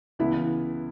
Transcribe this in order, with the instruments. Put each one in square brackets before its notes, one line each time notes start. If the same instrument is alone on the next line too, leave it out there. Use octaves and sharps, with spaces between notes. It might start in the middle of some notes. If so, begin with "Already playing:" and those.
[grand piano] C#2 C#3 E3 B3 [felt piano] E4